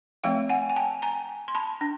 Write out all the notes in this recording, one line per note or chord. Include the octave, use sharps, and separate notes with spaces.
F3 A3 C4 F5 G5
F#5 G#5
G#5
G5 A5
G#5 A#5
C6
A5 B5
D4